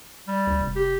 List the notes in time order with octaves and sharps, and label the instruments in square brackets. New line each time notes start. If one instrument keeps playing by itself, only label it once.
[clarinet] G3
[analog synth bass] D2
F1
[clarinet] G4